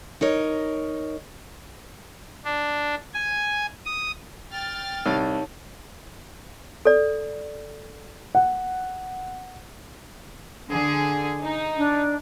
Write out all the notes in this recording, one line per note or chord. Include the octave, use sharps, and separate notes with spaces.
D#4 A#4 C#5
D4
G#5
D#6
G5 F6 A6
C2 D#4 C#5 A5
A4 D5
F#5
D3 G#4
D#4
D4